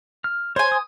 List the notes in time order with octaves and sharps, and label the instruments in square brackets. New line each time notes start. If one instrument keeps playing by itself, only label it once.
[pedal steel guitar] F6
[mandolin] C5 G#5 [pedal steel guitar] C#5
[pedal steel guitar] D#6